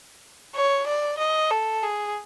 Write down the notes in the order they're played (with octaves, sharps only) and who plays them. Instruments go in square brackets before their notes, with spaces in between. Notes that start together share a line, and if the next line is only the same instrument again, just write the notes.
[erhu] C#5
D5
D#5
A4
G#4